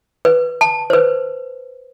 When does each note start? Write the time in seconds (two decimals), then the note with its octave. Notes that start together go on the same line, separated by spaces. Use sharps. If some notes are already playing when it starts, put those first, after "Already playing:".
0.25 B4
0.61 A5
0.90 B4 C5